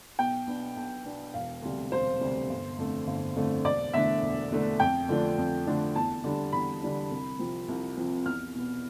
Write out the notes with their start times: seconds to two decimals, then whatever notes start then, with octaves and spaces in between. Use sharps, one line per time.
0.19 B1 G5
0.47 B2 B3 D4
0.77 B1
1.05 B2 B3 D4
1.34 E1 F5
1.62 D2 C3 G3
1.92 E1 C5
2.21 D2 C3 G3
2.49 G1
2.79 F2 D3 A3
3.07 G1
3.36 F2 D3 A3
3.64 E1 D5
3.94 E2 D3 A3 D4 E5
4.22 E1
4.51 E2 D3 A3 D4
4.80 F2 G5
5.08 D3 F3 A3 D4
5.38 F2
5.67 D3 F3 A3 D4
5.96 E2 A5
6.24 D3 G3 D4
6.53 E2 B5
6.81 D3 G3 D4
7.11 C2
7.39 C3 F3 C4
7.68 C2
7.97 C3 F3 C4
8.26 E2 F6
8.55 B2 B3